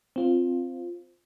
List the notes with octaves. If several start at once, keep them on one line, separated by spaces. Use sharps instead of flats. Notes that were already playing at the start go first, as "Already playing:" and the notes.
C4 F4